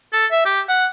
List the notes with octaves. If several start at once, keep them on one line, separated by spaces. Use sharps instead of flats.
A4
E5
G4
F#5